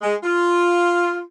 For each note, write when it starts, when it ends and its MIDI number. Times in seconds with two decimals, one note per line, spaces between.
0.02 0.16 56
0.23 1.20 65